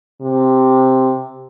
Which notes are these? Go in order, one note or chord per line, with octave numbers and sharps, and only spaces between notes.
C3